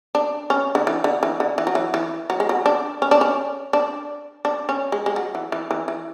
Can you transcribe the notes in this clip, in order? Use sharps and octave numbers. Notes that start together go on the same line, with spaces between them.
D4
C#4
D3
E3
D3
E3
D3
E3
F#3
E3
E3
F#3
G#3
F#3
D4
C#4
D4
C#4
D4
D4
C#4
G#3
G#3
F#3
E3
E3
E3
E3